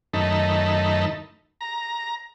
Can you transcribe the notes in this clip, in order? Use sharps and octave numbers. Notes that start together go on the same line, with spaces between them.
F#2 D#3 A3 D#4 A5 B5
A#5